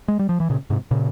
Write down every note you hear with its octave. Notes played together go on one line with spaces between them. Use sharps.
G#3
G3
F3
E3
A#2 C#3
G#2 C3
A#2 C#3